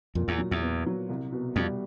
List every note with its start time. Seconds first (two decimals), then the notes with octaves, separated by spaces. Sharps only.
0.15 F2 A#2
0.28 E2
0.38 F#3
0.51 E2
0.62 B3
0.86 F#3
1.09 C2
1.32 B2
1.56 F2 G3